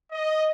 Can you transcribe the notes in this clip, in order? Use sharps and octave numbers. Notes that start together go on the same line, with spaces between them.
D#5